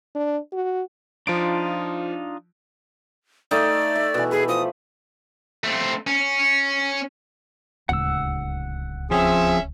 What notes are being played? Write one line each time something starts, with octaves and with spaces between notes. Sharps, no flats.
D4
F#4
F3 D4 D#4 F4 D7
A3 D#4 G4 D5
E5
B2 E3
G#4 B4
F3 D#6
A3 C4
C#4
D1 C#2 F#5 E6
F3 C4 C#4 G#4 E5